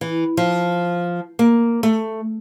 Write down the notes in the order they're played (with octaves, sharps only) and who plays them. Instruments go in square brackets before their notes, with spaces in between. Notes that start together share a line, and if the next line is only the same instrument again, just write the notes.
[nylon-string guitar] E3
F3
A#3
A3